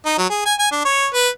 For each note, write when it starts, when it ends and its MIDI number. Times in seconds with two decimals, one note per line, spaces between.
0.06 0.16 63
0.18 0.26 54
0.30 0.43 68
0.46 0.54 80
0.59 0.68 80
0.71 0.81 62
0.85 1.07 73
1.14 1.29 71